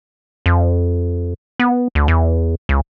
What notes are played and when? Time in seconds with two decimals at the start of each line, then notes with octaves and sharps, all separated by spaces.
0.46 F2
1.60 B3
1.95 D2
2.08 E2
2.69 C#2